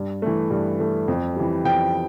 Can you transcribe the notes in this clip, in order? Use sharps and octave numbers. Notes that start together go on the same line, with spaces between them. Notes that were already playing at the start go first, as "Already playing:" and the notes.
Already playing: G2
E3 A3
G2
E3 A3
F2
E3 G3
F2 G5